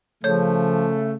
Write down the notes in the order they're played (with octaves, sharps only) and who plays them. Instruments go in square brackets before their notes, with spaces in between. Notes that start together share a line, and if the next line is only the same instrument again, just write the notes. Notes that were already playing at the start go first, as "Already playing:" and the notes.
[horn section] C#3 A3 [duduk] F3 [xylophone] C#5 G6